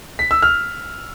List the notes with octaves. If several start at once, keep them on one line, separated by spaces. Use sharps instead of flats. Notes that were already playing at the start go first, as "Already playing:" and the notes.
B6
E6
F6